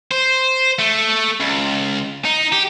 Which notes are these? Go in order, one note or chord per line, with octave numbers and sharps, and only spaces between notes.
C5
A3
C#2
D#4
G4